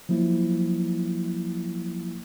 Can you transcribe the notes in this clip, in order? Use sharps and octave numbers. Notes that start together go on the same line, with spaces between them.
F3 F#3 A#3 E4